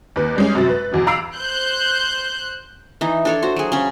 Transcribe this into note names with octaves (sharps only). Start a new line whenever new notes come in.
D#2 B4
G3 G#3 C#4
F#2 C3 A6
B4
E2 B2 F#3
F5 A#5 B5 E6 C7 D7
C5 F#6 G6
E3 D#4
D4 A4 C#5
F#4 C5
F#3 G#4
C#3 C#4